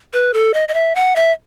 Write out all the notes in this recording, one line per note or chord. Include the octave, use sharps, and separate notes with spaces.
B4
A4
D#5
D#5
E5
F#5
E5